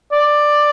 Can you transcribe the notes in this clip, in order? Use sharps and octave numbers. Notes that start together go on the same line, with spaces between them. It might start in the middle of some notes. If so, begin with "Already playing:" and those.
D5